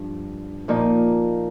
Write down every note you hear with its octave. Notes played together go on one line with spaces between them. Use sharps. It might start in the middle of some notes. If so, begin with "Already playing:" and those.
Already playing: G2 F3
A#2 F3 A#3 D#4